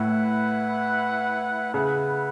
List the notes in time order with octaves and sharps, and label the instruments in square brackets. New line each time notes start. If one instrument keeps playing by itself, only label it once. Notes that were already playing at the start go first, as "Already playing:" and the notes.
Already playing: [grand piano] A2 [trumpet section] E4 B4 F#5
[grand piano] C#3 [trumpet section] E4 B4 F#5